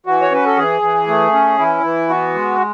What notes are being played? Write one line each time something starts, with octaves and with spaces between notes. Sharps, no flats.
E3 F#4
C#5
C#4 B4
A4
E3 G#4
E3
A3
C#4
E3 E4
E3
B3 F#4
G#3